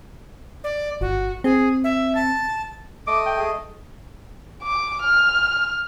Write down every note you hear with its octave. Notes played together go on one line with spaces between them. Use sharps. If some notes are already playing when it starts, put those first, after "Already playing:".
D5
G1 F#4
C4 G#4
E5
A5
A3 D#5 D6
G5
G#4
D6
F6